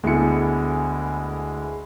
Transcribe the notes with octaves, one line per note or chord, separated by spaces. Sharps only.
D2 G#3 A3 B3 E4 C#7